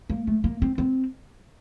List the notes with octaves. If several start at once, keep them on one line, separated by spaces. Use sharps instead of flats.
A#3
A3
A#3
C4
C4